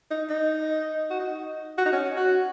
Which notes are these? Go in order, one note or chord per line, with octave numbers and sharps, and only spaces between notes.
D#4
D#4
F#4
D#4
F#4
D#4
C#4
F#4